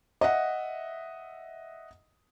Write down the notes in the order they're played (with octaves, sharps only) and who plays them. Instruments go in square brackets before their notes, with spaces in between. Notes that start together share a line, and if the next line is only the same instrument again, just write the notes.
[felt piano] D#5 E5 F#5